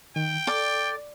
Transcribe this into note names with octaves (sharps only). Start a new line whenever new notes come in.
D#3 G5
A4 D5